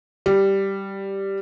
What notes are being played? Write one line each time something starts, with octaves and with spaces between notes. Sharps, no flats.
G3